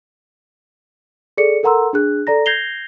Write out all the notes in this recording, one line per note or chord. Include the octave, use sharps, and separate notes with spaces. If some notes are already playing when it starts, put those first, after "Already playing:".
G#4 A4 D5 C#7
A4 A#4 F#5 A#5 C6 E6
D4 G#4 F#6
A4 D5 A#5 A#6
G6 G#6 A#6 C7 F7 G7